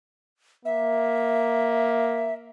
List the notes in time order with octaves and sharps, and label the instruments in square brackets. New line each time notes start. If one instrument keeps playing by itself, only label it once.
[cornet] A#3 [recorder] E5